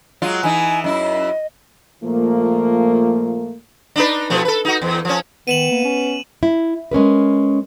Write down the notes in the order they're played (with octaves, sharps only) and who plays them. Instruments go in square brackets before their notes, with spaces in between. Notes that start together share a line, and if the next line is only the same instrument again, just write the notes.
[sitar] F#3 G#3 F4
[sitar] E3 D#4 [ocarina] G#5
[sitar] F#2 E4 [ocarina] D#5
[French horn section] A#2 F3 A3 A#3
[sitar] D4 D#4 B4
B2 F3 A3
A4 B4
D#4 F#4
E2
F3 C#4
[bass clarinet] D#3 [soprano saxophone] B3 [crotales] D#7 E7 F#7
[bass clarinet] A#3
C#4
[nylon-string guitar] E4
G#3 C#4 A#4 B4